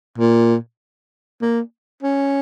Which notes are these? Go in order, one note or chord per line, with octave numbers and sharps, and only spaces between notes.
A#2
A#3
C#4